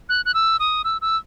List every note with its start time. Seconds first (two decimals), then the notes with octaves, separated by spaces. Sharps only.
0.09 F#6
0.25 F#6
0.34 E6
0.59 D#6
0.84 E6
1.01 E6